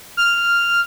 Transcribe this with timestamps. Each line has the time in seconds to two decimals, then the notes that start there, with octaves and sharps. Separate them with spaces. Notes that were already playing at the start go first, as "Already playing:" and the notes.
0.17 F6